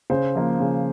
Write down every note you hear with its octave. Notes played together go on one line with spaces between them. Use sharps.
C#3 C5
F3 A#3
C#3